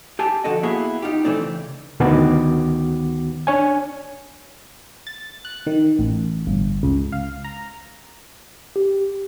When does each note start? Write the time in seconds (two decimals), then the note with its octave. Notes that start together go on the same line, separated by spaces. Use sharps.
0.19 G4 G#5 A5
0.44 F2 D3 F#4 A4 D#5
0.63 A#3 B3 E4 F#4 G#4 E5
1.02 D#4 F4 G4
1.24 E3 A3 C4 D4
1.42 C#2
2.00 D2 D#3 B3 F#4 D6
3.47 D4 C#5 G#5
5.07 A6
5.45 F#6
5.67 D#3
5.99 A1
6.47 G1
6.83 C#2
7.12 F5
7.45 A#5
8.76 G4